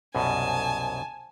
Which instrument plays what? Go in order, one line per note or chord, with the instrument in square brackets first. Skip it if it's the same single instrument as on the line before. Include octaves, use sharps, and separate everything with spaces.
[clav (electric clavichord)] C2 F#2 B2 [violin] G#5 A5